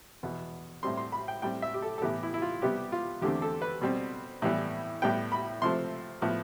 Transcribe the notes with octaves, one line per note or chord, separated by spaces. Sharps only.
E2 B2 B3
A2 G3 C4 C6
C6
B5
G5
A2 G3 C4 G5
E5
G4
A4
A4
A2 E3 B3 G4
E4
E4
F4
C3 G3 B3 G4
F4
E2 D3 A3 C4 G4
A4
B4
B2 G3 C4
A2 E3 G3 B3
A2 G3 B3 G5
B5
C3 F3 A3 C4 C6
A2 F3 B3